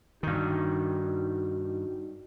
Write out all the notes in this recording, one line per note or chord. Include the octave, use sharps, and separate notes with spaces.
G2 D#3 D#4 F#4